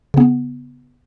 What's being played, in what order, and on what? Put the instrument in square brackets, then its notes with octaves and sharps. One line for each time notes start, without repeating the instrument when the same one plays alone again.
[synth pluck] C#3 B3